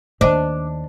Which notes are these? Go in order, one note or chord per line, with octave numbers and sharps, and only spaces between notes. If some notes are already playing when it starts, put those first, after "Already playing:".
D#2 D#3 D4 C5 D#5 A5